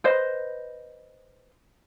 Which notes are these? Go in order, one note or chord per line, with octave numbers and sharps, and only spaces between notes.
B4 C5 D#5